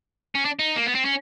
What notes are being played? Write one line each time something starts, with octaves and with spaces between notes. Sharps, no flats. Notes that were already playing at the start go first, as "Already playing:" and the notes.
C#4
D4
D#4
A#3
B3
C4
C#4